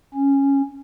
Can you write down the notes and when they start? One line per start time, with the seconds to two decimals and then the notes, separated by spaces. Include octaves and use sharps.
0.14 C#4